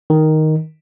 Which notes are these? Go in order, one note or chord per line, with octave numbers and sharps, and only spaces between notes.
D#3